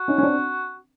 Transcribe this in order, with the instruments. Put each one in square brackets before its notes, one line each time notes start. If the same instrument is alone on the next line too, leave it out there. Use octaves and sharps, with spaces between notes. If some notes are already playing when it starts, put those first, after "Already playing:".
Already playing: [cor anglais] F#4
[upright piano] C#4 D#4
C#4
C4 D4